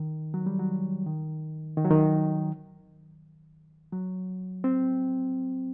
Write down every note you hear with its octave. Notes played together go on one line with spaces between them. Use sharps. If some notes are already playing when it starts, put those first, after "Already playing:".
Already playing: D#3
F#3
G3
F#3
D#3
D#3
F#3
D#3
F#3
C4